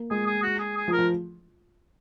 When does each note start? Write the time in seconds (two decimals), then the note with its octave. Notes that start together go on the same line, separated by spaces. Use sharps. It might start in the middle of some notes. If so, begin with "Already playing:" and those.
Already playing: A#3
0.11 G#3 G#4
0.27 G#4
0.43 F#4
0.60 G#4
0.77 G#4
0.88 F3
0.93 A#4
0.99 F3